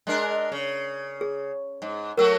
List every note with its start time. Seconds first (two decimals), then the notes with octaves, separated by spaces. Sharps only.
0.07 G#3 D4 A#4
0.52 C#3
1.21 G#4
1.82 G#2
2.17 F#3 A3 F#4 A#4 E6